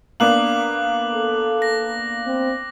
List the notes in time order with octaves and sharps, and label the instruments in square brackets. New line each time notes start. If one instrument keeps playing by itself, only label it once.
[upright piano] A#3 B3 D4 [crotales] D6 F#6 F#7
[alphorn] A4
[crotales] A#6
[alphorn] C4